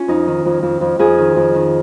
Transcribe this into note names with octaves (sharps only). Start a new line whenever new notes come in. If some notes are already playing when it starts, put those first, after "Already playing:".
Already playing: C#4 F4
F2 D#4
D#3
F2
F2
F2
F2 G#4
D#3
F2
D#3